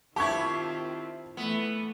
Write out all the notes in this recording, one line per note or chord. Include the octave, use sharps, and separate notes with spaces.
D#3 C4 E4 F4 G4 A5 C#6 G#6
E3 A3 B3